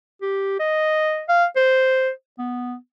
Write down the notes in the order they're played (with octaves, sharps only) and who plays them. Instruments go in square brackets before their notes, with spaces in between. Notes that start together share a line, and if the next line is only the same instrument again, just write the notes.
[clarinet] G4
D#5
F5
C5
B3